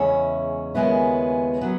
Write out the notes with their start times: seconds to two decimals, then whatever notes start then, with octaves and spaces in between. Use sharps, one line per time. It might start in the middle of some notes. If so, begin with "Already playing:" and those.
Already playing: E2 C#3 G#3 C#4 E4 C#5
0.74 D#2 C#3 G#3 B3 E4
1.61 F#3 B3